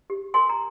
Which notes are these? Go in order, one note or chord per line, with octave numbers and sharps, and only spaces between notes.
G4
A#4 G#5 C6
A#5